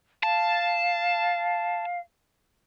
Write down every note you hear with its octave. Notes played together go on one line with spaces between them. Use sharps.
F5 A5